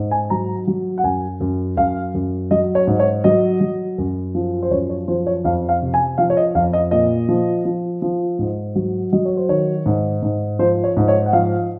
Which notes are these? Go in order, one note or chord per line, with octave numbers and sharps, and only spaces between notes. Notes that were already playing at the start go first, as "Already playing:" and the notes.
Already playing: G#2
G#5
F#3 A#5
F#3
F#5
F#2 G#5
F#2
F#2 F5
F#2
F#3 D#5
C#5
G#2
C#5
F#3 D#5
F#3
F#2
F3
C5
F#2 C#5
C#5
F3 C5
C#5
F2 F5
F5
C3
G#5
F3 F5
C#5
D#5
F2 F5
D#5
A#2 D#5
F3
F3
F3
G#2
F#3
F#3 D#5
C#5
C5
D#3 C#5
G#2
G#2
F3 C5
C#5
G#2
C#5
F#5
F3 F5